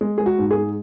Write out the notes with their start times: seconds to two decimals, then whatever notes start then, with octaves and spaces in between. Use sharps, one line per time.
0.01 G#3
0.18 G#3 G#4
0.26 F#4
0.39 G#2
0.51 G#4
0.57 G#3